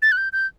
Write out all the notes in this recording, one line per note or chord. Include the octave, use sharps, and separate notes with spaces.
A6
F#6
G6
G6